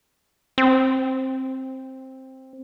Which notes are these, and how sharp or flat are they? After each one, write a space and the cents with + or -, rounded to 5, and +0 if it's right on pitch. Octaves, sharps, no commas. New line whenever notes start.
C4 +10